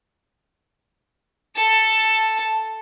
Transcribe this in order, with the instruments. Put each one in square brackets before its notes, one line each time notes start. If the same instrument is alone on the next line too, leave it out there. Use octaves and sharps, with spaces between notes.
[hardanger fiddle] A4 A5